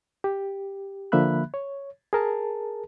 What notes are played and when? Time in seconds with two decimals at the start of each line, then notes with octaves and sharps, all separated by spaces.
0.24 G4
1.12 D3 F3 A#3 E5 B5 F#6
1.54 C#5
2.13 G#4 A#4 A5